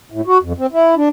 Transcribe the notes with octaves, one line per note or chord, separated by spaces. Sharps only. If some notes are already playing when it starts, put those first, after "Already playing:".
A2
F#4
F2
C4
E4
D4